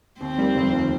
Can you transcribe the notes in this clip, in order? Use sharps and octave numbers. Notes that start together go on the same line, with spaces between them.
D#2 C4
D#3 G3 A#3
F1
D#2 D#3